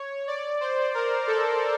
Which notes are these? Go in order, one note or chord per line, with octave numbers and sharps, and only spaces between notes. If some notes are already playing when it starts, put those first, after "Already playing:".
Already playing: C#5
D5
C5
A#4
A4